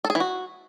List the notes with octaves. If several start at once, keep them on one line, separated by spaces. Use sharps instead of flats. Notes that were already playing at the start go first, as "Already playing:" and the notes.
A4
G#4
E3
F#4